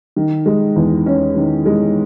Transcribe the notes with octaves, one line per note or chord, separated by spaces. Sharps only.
D#3
G#3
E2
C#4
D#3
G#3